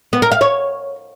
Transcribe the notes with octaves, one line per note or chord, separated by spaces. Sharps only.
B3
A#4
F5
C#5